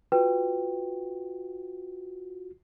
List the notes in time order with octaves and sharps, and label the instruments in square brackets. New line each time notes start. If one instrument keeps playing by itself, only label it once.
[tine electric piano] F4 F#4 [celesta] B4 G5